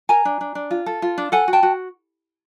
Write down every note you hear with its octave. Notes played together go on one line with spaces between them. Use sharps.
A#4 G#5 A#5
D4
D4
D4
F4
A4
F4
D4
A4 F#5 G#5
F#4
G5 A5
F#4